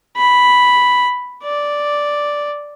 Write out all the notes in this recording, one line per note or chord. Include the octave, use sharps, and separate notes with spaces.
B5
D5